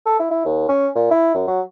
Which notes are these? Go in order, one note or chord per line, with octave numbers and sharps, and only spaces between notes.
A4
E4
E4
D#2
C#4
A#2
E4
F#2
F#3